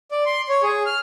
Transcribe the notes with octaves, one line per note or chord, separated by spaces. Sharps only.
D5
C6
C#5
G#4
F6